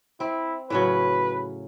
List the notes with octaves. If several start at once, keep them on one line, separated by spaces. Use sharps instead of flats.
C4 E4
A2 C#3 F#3 B4